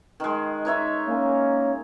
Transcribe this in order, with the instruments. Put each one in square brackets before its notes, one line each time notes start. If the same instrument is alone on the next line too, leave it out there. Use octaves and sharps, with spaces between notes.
[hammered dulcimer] D#3 G#3
D#4 C#5 E5
[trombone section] A#3 C#4